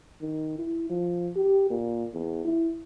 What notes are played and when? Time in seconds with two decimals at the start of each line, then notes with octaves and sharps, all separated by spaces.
0.21 D#3
0.58 E4
0.89 F3
1.35 G4
1.70 A#2
2.14 E2
2.44 E4